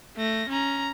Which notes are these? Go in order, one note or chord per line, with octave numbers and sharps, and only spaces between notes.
A3 A#6
C#4 A#5